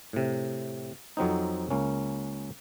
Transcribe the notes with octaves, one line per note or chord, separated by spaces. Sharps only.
A2 C3
F2 F#3 C4 D#4
C#2 A#3 C#4